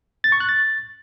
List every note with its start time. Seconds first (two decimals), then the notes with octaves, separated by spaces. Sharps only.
0.24 A6
0.32 C#6
0.40 F#6
0.49 A6